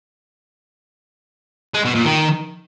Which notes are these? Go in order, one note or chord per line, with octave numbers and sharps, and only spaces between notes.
G#3
B2
A#2
D#3